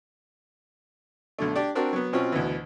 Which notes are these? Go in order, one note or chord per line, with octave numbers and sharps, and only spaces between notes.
B1 D3 A3
D4 G4 D5
C4 D4 F#4 A#4 D5
F#3 B3
B2 C4 C#4 F4
D2 B2 E3